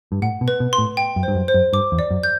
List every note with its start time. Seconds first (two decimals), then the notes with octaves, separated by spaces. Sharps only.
0.12 G2
0.22 A2 F#5
0.41 B2
0.48 B4
0.60 B2
0.73 C6
0.78 A2
0.97 G5
1.16 F#2
1.23 G2 C5
1.35 F#2
1.48 C5
1.54 F#2
1.73 G2 D6
1.92 E2
1.99 D5
2.11 F#2
2.23 G6